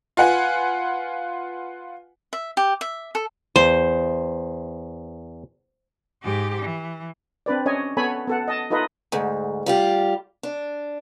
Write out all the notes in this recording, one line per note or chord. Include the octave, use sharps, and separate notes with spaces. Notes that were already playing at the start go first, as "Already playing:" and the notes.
F4 B4 F#5 G#5
E5
G4
E5
A4
E2 C5
G#2 G4
E3
C4 D4 B4 D5
C#4 C#5 D#5 G#5
B3 A4 C#5 G#5 B5
B3 A4 F#5
D#5 A5
D#4 F4 A4 B4 D#5
D2 G#2
G3 F4 G4
D4